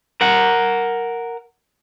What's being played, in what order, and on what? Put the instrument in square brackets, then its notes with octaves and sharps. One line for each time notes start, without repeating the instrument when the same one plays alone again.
[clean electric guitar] A#4 F#5